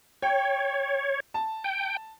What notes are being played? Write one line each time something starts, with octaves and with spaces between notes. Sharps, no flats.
C#5 G5
A5
G5